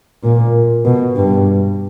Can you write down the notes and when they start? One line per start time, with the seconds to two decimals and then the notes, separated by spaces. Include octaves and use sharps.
0.24 A#2
0.85 B2
1.16 G2